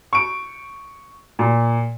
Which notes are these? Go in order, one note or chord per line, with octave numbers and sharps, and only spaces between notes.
C#6 D7
A#2